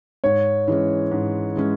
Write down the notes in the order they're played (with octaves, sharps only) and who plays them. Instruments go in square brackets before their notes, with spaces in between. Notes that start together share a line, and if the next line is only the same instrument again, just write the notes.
[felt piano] G#2 [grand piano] C#5
[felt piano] E3 G#3 C#4
G#2
E3 G#3 C#4